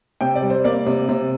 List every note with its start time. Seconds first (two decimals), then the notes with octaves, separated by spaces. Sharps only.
0.21 C3 G5
0.35 D5
0.42 G3
0.50 C5
0.64 A#3 D5
0.86 C3
1.09 C3